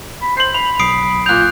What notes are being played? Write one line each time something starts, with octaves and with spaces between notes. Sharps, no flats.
B5
C5 C7 F#7
B5 F7
B1 D#6 C7 D7
A#2 F#6 G6 F7